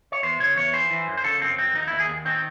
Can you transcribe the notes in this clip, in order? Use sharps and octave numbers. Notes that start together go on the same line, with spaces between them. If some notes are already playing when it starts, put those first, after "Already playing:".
C#5
E2 C5
C#3 C#5
E2 C#5
E3 C5
E3
F#2
C5
C#3 A4
F#2 C4
F#2 C4
D#2 D#4
D#2 E4
G#4
D#2
D#3 C4